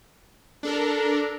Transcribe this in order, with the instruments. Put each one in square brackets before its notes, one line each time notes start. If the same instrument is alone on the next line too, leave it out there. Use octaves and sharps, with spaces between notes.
[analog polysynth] D4 A4 A#4